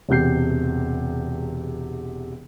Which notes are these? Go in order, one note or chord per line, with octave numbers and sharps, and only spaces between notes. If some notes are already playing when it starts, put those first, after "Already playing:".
E1 E2 C3 G6 C7